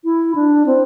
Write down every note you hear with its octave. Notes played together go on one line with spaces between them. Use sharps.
E4
D4
C4